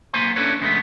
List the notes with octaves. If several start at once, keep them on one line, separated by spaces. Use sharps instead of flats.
B1 A#3 B3 C5 G#5 C6
C#4 D4 E4 A4 B4 C#5
F2 C#3 G#3 A3 B3